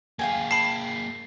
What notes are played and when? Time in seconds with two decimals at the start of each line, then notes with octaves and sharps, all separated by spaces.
0.19 A#3 G#4 F5 G5 G#5
0.51 A5 B5 C7